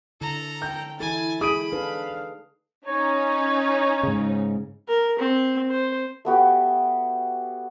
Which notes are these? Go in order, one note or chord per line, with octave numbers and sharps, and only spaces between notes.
D3 E4 A4 A#5
G5 G6
E3 E4 A4 G#5 A6
G#4 B5 D#6 D7 D#7
D4 D#4 A4 B4 F5
C#4 D#4 C#5
G#2 C#3
A#4
C4
C5
A3 B3 F#4 G4